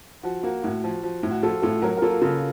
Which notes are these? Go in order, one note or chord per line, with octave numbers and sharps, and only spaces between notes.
F3 F#4
A#3 F#4
A2 F#4
F3
F3
A2
F#4
F3 F4 A4
A2 F4 A4
F#3 F#4 A#4
A#4
A#3 F4 A4
C#3 F4 A4